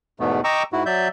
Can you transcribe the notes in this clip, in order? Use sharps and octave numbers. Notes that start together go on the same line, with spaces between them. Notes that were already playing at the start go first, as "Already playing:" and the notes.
E2 G#2 B2 A3 B3
D#5 G5 A#5 C#6 D6 E6
G#2 E4 F#4
F#3 D5 E5 G6